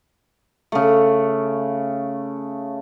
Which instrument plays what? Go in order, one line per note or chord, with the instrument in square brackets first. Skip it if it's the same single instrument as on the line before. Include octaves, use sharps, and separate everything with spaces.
[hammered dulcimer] C#3 A3